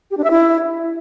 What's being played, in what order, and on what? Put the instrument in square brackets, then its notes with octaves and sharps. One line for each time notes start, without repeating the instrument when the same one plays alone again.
[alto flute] G4
D4
E5
E4